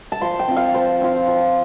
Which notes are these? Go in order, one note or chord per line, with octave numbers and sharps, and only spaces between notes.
A5
F3 C6
G5
C4 F4
F5
F3 C5
C4 F4
F3